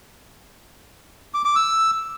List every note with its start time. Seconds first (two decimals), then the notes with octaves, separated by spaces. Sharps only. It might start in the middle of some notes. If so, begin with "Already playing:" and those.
1.34 D6
1.45 D6
1.56 E6